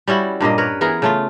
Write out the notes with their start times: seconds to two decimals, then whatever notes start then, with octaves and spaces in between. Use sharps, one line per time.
0.08 G3 C#4 E4 F#4
0.40 G2 A#2 A#3 D#5
0.58 A#4 B4 C#5
0.81 E3 B3 G#4 A#4
1.02 C#3 A3 F4